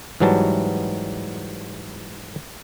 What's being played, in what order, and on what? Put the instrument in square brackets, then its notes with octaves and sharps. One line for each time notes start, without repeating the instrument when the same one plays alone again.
[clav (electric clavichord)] G#2 E3 F#3 G3 A5